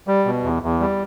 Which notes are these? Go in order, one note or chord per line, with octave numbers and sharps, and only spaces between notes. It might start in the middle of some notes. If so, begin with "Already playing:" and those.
G3
B2
E2
E2
G3